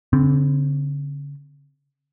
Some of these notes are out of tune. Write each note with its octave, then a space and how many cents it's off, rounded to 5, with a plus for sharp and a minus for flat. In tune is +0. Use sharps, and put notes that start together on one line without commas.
D3 -45 C4 +0